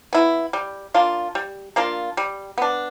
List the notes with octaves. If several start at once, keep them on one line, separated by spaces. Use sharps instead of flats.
B3 E4
G3
A#3 D4 F4
G3
A#3 D4 F4
G3
B3 D4